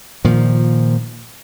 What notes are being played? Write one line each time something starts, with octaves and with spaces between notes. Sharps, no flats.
A#2 D#3 F3